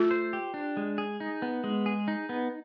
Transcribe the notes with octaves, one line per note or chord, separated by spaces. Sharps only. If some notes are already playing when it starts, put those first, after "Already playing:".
Already playing: A3 F4
C5
G4
D4
G#3
G#4
D#4
B3
G#3
G#4
D#4
B3